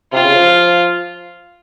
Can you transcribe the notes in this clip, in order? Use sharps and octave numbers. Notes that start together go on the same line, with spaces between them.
C3 F4
C#3
F3